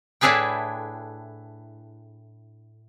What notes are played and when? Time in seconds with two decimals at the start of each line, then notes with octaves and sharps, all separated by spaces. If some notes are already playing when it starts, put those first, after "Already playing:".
0.21 A2 D4 E4 G#4 B4 G5